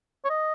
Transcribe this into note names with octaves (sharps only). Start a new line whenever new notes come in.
C#5
D#5